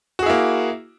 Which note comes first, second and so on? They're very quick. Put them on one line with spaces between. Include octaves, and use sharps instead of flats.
F#4 G#4 E4 A#3